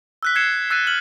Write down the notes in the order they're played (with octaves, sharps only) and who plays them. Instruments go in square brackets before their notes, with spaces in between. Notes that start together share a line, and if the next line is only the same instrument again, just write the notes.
[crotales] E6 F#6 B6
F#6 G#6 C7 C#7 E7
E6 F#6 A6 C7 D#7
F6 F#7